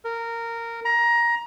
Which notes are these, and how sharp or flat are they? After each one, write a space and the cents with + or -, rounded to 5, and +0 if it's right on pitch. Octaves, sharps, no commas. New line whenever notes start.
A#4 -15
A#5 +20